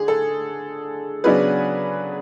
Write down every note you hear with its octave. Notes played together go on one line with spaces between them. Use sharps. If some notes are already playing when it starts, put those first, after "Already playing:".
Already playing: D3 G#4
A4
C#3 F#3 B3 D4 G#4 B4